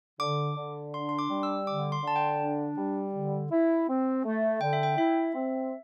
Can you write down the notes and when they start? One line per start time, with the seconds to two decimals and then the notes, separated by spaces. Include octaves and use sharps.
0.20 D3 D6
0.57 D3
0.93 D4 C6
1.09 C6
1.19 D6
1.30 G3
1.43 E6
1.67 D3 D6
1.92 C6
2.04 D3 A5
2.16 G5
2.40 D4
2.77 G3
3.14 D3
3.51 E4
3.88 C4
4.25 A3
4.61 D3 G5
4.73 E5
4.83 G5
4.98 E4 E5
5.35 C4